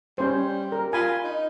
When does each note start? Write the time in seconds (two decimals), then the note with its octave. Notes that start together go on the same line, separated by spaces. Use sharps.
0.18 G3 C#4 C5
0.72 A#4
0.93 F4 G#5 B5
1.24 D#4